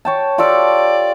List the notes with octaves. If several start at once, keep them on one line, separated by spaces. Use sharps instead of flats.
C#5 G5 A5
F4 G4 A4 D5